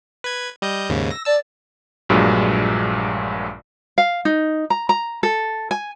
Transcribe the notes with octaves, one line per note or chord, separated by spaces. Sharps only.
B4 G#6
G3 D#5 G6
D#2 G#2 C#3
E6 A#6
D5 A5 E6
A#1 G2 A#2 F#3 G#3
F5
D#4
A#5
A#5
A4
G#5